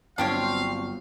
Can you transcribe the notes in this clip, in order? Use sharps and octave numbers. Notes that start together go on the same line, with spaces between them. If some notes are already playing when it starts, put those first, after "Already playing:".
G1 F#3 C4 D4 G4 C#5 F5 C#6